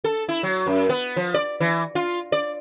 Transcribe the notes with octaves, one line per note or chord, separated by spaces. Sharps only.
A4
E4
F#3
F#2
B3
F3
D5
E3
F4
D5